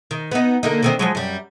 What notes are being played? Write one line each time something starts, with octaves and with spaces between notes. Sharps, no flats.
D#3
B3 D#4
D3 A#3 D#4
D3 D#3 C4
F3 F#3 G#3
F#2 G3